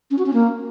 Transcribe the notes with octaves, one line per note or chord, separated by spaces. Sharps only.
C#4
F#4
C#4
A#3